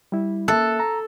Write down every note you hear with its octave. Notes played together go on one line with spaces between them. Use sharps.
G3 E4
A#3 A4 E5 F#6
A#5